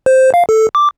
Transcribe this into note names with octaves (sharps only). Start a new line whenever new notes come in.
C5
F5
A4
D6